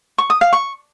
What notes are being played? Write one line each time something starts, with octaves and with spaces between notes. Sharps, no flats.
C#6
D#6
F5
C#6